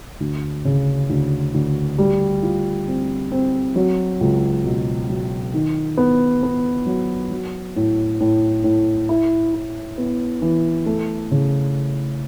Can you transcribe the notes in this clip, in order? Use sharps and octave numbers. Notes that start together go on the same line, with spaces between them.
D2
C#3
D2
D2
G3
F4
C4
C4
F#3
C#2
B2
F#3
D#3
B3
B3
F#3
F#3
A2
A2
A2
E4
E4
B3
E3
A3
C#3